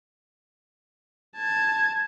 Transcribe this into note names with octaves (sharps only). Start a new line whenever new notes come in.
A5 G#6